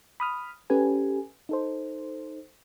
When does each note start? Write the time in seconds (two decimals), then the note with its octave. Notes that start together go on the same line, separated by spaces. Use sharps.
0.20 B5 D#6 F6
0.70 C#4 G4 A4 B4 G#5
1.49 D#4 A4 C5